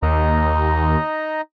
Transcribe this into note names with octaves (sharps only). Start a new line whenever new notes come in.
D#2 D#4 D#5 A#5